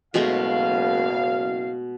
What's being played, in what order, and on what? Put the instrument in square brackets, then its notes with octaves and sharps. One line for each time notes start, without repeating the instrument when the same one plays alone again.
[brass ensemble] F#1 F5 [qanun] B2 G#3 A3